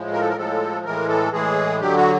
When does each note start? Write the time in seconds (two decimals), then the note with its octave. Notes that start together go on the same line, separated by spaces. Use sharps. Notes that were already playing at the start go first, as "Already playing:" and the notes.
Already playing: A2 F3 G#3
0.13 A#4
0.21 A4
0.29 A#4
0.37 A2 F3 G#3 A4
0.85 A2 E3 G#3 A#4
1.08 A4
1.32 A2 E3 G#3 G#4
1.80 D3 F#3 G4
1.97 F#4